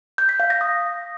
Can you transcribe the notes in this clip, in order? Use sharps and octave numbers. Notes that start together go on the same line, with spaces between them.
G6
B6
F5
A#6
D#6